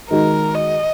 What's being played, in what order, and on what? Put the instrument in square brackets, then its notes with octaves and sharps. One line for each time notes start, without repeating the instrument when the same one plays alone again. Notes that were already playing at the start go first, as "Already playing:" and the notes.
[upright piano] D#3 G#3 D#4 F#4 [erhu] A#4
[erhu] D#5